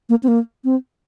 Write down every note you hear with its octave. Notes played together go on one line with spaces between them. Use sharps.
A#3
C4
A#3
C4